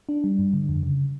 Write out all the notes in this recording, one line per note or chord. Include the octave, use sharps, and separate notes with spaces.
D4
G3
G2
D3
F2
C#3